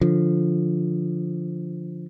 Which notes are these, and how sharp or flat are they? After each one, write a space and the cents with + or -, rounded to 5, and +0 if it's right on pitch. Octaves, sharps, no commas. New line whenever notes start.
D3 +0 F3 +0